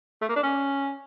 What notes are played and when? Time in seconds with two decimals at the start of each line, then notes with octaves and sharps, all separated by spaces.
0.22 A3
0.29 A#3
0.36 D4
0.43 C#4